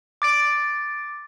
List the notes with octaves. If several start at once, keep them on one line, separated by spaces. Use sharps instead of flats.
D6 A6 D7